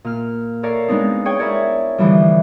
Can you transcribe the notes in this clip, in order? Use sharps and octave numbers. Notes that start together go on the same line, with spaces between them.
A#2 F6
A4 A#4 C#5 D5 F5
G#3 B3 C4 D4 D#4
G#4 C#5 G5
E4 A#4 C#5 D5
A2 D3 E3 F3 G3